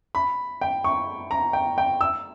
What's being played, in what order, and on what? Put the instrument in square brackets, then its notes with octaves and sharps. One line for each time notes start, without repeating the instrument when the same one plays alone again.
[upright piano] B5
G5
C#6
A#5
G5
G5
E6